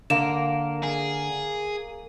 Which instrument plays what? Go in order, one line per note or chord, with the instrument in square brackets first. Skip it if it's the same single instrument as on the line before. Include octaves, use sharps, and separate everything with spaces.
[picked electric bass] D3 [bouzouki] A#3 [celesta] E7
[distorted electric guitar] G#4